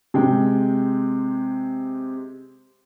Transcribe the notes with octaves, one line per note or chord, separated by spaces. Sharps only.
C3 G#3 G5